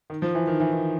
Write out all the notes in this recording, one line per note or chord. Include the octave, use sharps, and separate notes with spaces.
D#3
F3
E3
D#3
E3
D#3